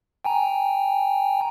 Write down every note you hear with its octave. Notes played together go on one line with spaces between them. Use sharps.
G5 G#5 A#5